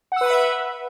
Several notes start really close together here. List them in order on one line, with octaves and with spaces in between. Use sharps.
F#5 E6 B4 B5 E5